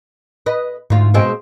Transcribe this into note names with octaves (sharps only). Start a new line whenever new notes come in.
B4 D#5
D2 G#2 F4
B2 G#3 C4